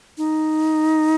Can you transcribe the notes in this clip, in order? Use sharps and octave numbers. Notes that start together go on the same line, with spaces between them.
D#4